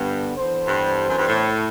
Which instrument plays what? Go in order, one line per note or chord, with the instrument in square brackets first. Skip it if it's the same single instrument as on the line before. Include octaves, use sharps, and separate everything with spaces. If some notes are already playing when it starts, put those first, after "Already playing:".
Already playing: [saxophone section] G2 [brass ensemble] D3 G3 B3
[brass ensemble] E3 B3 D4 A4 C5
[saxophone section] G2
F#2
G2
A2